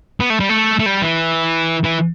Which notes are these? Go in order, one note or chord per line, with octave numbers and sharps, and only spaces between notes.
B3
A3
G3
A3
A3
G3
E3
E3